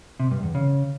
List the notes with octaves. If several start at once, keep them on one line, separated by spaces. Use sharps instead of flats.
C3
G2
E2
C#3